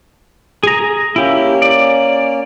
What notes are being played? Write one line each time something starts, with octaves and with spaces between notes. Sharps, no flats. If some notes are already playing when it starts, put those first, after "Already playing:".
G#4 A#5
A#3 C#4 E4 G4
D5